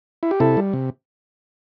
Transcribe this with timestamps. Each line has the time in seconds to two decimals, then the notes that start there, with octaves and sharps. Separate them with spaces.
0.23 E4
0.31 G4
0.40 C3 E4 A4
0.57 G3
0.73 C3